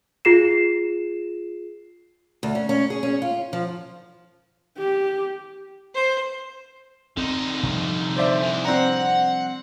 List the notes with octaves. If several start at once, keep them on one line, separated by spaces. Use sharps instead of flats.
F4 G#4 C7 E7
D2
C#4
C#4
G#4
C#4
F4
F3
G4
C5
D3 C4 D#4
C3 F3 G3
C5 D5 E5
E2 E3
C4 D4 F#5 A#5